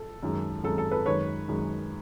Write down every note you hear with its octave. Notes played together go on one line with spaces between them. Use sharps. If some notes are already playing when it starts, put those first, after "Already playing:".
Already playing: A4
F#2 D#3 G#3
F#2 D#3 G#3 A4
A4
A4 B4
F#2 D#3 G#3 B4 C#5
F#2 D#3 G#3